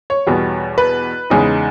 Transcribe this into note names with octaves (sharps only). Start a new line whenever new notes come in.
C#5
E2 B2 G3 B3
B4
E2 C#3 G#3 D#4